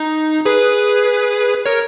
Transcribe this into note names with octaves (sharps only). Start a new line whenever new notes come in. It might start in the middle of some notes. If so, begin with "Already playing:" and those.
Already playing: D#4
G#4 B4
A#4 C#5